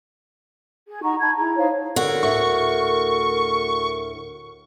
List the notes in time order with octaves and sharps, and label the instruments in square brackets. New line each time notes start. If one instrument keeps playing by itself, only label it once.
[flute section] G#4
D#4 F#5 A#5 C#6
D#4 A5 B5 G#6
E4 G#4 A#5
D#4 C5 C#5 F5
[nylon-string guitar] D3 [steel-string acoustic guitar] F#4 [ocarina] A#4
[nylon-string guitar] D2 A2 [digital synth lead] C#6